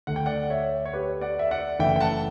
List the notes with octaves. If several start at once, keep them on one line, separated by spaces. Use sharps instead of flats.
D2 D3 A3 F#5
G5
D5 F#5
C#5 E5
C#5
G4 B4
D5 F#5
E5
D5 F#5
F#1 F#2 E3 A3 E5 G5
G5
F#5 A5